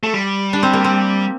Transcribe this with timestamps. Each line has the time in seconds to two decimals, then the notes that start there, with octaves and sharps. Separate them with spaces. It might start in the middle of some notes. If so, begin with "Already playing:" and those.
0.03 A3
0.13 G3
0.53 D4
0.63 C4
0.73 A#3
0.84 C4